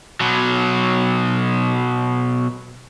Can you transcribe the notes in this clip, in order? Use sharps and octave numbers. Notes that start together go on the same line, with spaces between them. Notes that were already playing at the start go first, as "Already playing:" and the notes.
B2 F#3